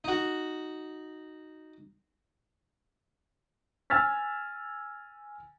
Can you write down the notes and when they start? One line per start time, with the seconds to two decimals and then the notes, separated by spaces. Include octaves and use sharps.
0.04 D#4 F#4
3.90 G#5 E6 F6 G#6 A6 B6